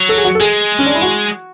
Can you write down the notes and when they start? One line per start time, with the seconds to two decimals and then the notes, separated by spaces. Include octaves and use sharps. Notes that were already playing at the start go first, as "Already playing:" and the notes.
Already playing: F#3
0.09 A4
0.17 G#4
0.25 F#4
0.35 A4
0.40 G#3 G#4
0.79 C#4
0.86 D4
0.95 E4
1.02 F#4